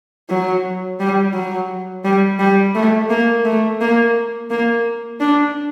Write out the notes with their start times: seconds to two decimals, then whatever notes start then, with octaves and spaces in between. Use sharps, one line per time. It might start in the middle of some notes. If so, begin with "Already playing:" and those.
0.29 F#3
1.00 G3
1.34 F#3
2.04 G3
2.39 G3
2.75 A3
3.10 A#3
3.45 A3
3.81 A#3
4.50 A#3
5.20 D4